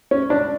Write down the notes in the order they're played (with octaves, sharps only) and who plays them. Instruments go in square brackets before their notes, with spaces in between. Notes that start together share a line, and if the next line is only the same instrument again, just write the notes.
[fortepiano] C#4
D4